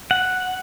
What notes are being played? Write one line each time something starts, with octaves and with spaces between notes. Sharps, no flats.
F#5